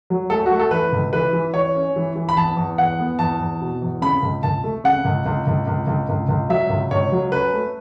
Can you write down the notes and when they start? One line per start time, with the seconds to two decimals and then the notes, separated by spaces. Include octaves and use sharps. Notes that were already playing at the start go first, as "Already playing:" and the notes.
0.10 F#3
0.30 A3 A4
0.46 F#4
0.51 A3
0.59 A4
0.71 E3 B4
0.92 C#2
1.13 E3 B4
1.33 E3
1.54 E3 C#5
1.75 C#4
1.96 E3
2.16 E3
2.29 B5
2.36 E2 A5
2.57 E2
2.78 E2 F#5
2.99 B3
3.19 E2 A5
3.39 E2
3.61 B2
3.82 E2
4.02 C#3 B5
4.23 C#2
4.43 C#2 A5
4.64 A3
4.84 C#3 F#5
5.05 C#2
5.26 C#2
5.47 C#2
5.67 C#2
5.87 C#2
6.09 C#2
6.29 C#2
6.49 F#3 E5
6.70 C#2
6.91 C#2 C#5
7.12 F#3
7.32 C#4 B4
7.53 A3